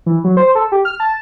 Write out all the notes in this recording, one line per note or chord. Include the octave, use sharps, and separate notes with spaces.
E3
F#3
C5
A4
G4
F6
A5